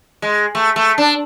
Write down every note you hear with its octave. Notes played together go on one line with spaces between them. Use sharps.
G#3
A3
A3
D4